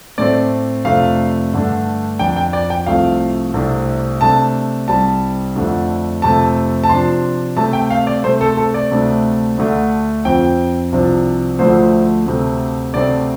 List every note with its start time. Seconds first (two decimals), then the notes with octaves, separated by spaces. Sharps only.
0.18 A2 A3 C4 D5
0.85 F2 C3 A3 D4 F5
1.53 G2 D3 A3 D4
2.19 F2 F3 D4 G5
2.36 G5
2.53 D5
2.70 G5
2.86 C2 C3 F3 A3 F5
3.54 C2 C3 A3 D4
4.21 C3 A3 D4 A5
4.88 C2 C3 G3 A5
5.55 F2 D3 A3 D4
6.22 F2 C3 A3 A5
6.84 A5
6.89 C3 F3 D4 C6
7.56 C3 A3 C4 A5
7.73 G5
7.90 F5
8.07 D5
8.24 C3 A3 C4 C5
8.41 A4
8.57 A4
8.74 D5
8.91 D2 C3 A3 D4
9.58 D2 D3 A3 D4
10.25 F2 F3 C4 G5
10.92 C2 C3 F3 D4
11.59 D2 D3 F3 A3 C5
12.26 D2 C3 A3
12.94 D2 C3 A3 C4 D5